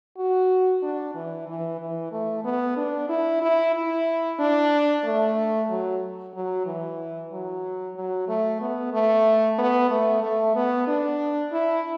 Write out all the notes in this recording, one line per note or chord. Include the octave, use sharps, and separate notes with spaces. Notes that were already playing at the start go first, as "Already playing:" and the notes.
F#4
D4
E3
E3
E3
A3
B3
D4
E4
E4
E4
D4
A3
F#3
F#3
E3
F#3
F#3
A3
B3
A3
B3
A3
A3
B3
D4
E4